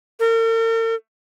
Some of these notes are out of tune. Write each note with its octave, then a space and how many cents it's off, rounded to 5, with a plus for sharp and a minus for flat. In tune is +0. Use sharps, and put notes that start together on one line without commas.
A#4 -45